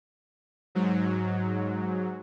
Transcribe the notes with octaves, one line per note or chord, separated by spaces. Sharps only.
G#2 F#3